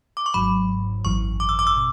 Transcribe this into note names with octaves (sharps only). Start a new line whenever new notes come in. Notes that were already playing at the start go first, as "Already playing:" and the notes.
D6
C#6
G#1 G#2 F#3 B5
G#1 F#2 E3 C#6
D6
E6
D6
E6
B2